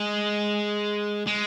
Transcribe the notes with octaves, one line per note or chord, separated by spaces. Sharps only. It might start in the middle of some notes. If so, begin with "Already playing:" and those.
Already playing: G#3
G#3